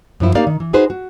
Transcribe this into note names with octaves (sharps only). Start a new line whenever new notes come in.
F#2 F3 E4
A#3 D#4 G4 A#4 D5 F5
D#3
E3
D#4 F#4 G#4 B4 C5
F#4